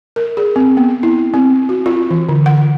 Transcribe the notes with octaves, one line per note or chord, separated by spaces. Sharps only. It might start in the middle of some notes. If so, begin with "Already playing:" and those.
A#4
G#4
C4
B3
E4
C4
F#4
F4
E3
D3
F#5